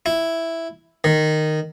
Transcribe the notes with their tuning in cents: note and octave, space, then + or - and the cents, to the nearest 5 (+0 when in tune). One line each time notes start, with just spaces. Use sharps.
E4 +0
D#3 -10